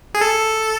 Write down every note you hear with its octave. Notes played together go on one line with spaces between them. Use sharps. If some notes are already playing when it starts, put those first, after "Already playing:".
G#4
A4